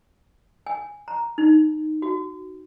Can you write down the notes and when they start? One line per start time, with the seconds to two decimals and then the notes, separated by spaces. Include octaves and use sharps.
0.66 G#5
1.08 A#5
1.38 D#4
2.02 F#4